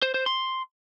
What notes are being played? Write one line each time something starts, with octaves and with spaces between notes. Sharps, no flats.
C5
C5
C6